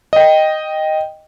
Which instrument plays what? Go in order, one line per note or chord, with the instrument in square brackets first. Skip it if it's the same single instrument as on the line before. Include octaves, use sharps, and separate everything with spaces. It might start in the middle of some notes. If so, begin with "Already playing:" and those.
[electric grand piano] D#5 G5